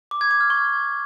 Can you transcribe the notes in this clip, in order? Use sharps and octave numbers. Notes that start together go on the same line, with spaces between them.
D6
G#6
D6
F6
C#6